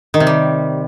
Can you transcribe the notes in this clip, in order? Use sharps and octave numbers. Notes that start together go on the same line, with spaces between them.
D#3
C3
G3